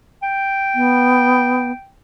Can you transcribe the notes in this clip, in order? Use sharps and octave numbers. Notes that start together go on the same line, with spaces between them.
G5
B3